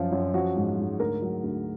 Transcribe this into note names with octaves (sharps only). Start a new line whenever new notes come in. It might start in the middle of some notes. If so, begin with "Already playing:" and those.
Already playing: F#2 F3 F4
F#2
F3 F#4
G#2
G#2
D2 A#4
F#3
D2